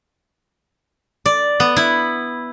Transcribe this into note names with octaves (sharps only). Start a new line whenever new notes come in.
D5
B3
E4